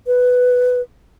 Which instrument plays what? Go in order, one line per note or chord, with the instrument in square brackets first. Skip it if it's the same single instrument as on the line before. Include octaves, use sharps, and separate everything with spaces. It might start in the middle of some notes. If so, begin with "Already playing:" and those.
[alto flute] B4